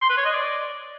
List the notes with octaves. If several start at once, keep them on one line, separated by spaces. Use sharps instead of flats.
C6
B4
C#5
D#5
D5